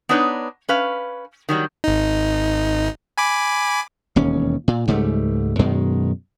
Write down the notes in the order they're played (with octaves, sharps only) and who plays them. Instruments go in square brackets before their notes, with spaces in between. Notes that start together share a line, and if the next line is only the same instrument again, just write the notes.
[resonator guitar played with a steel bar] B3 D4 D#4 B4 C#5
C#4 B4 F5
D#3 F#3 G3
[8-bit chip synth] G#1 D#4
G#5 B5 D6
[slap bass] E1 D#2 C#4
A#2
C#2 G#2 G3 A3
F#2 B2 D#3 G#3